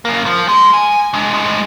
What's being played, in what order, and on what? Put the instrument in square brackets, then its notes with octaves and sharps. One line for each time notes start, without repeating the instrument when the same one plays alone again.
[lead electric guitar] F#2 A#3
F3
G#3
G#5
G#3 D4
A2 G#3